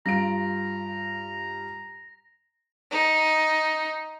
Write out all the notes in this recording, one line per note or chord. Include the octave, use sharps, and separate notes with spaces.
G2 F4 A#5 A#6 D7
D#4